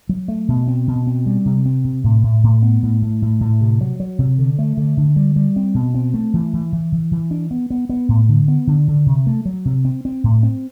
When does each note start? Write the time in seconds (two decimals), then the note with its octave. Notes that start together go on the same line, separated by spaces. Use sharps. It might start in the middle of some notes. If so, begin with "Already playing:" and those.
0.09 F#3
0.28 A3
0.48 B2
0.67 C4
0.88 B2
1.07 C4
1.26 G3
1.46 C3
1.66 C4
1.85 C3
2.04 A2
2.23 A2
2.43 A2
2.63 B3
2.83 A2
3.02 A2
3.22 A2
3.41 A2
3.61 C3
3.81 F#3
4.00 F#3
4.19 C3
4.38 D3
4.58 A3
4.77 D3
4.97 D3
5.16 G3
5.36 G3
5.56 C4
5.75 B2
5.94 C4
6.14 A3
6.34 E3
6.53 E3
6.73 E3
6.92 E3
7.12 E3
7.31 D4
7.51 B3
7.70 B3
7.89 B3
8.09 A2
8.29 D3
8.48 B3
8.67 D3
8.88 D3
9.06 C3
9.27 A3
9.45 F#3
9.65 C3
9.85 C4
10.05 C4
10.24 A2
10.43 C4